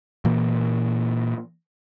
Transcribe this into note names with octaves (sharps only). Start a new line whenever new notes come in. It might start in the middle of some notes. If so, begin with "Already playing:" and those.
A#2 E3 A#3